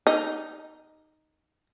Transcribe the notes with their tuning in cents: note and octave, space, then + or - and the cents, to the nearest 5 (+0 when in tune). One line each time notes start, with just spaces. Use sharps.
D#4 +0